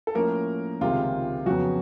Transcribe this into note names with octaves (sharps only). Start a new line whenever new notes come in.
A4
A2 F3 A#3 C#4 A#4
C#2 C3 D#3 G#3 F4
F2 C#3 F#3 B3 F#4